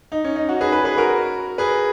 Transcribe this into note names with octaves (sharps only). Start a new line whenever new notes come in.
D#4
C#4
D#4
D#4 F#4
G#4 B4
G#4 B4
G#4 B4
F#4 A#4
G#4 B4